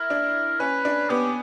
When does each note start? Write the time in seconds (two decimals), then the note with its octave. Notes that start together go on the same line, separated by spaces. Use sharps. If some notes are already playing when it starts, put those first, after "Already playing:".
Already playing: E4 A#4
0.10 D4
0.60 C#4 B4
0.85 D4
1.10 B3 G4